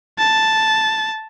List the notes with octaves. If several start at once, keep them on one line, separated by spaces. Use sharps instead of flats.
A5